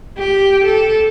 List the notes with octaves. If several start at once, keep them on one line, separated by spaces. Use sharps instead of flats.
G4
A4